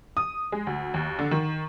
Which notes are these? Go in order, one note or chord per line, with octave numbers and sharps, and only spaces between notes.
D#6
G#3
D2
D#2
D3
D#3